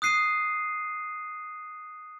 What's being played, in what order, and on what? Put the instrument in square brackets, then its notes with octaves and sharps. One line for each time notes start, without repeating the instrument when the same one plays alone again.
[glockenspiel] D#6 F#6 C7 D#7